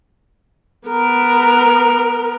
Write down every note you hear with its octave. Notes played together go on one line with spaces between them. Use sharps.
B3 A#4